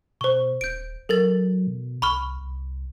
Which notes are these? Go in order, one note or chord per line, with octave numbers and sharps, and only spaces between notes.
B2 C5 C#6
D#1 G6 D7
F#3 A4 A#4 A6
B2
C2 B5 C#6 F6
C2